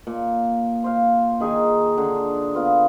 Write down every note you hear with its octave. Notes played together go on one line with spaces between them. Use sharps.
A#2
C5 F5
D#3 G#4 A#4 G#5
D3
B3 F4